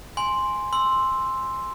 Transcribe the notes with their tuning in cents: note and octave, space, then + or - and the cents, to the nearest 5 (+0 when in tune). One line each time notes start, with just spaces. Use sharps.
G#5 +0 C6 +0
C6 +0 E6 +0